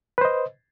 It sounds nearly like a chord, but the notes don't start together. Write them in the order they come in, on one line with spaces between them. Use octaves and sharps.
B4 C5 D#5